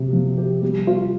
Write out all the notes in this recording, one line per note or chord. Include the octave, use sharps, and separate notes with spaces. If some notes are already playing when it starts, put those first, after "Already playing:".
Already playing: C3
F3
G4
G3
F4